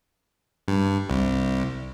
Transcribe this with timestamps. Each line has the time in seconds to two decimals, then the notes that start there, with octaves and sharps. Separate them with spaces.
0.68 G2
1.10 C2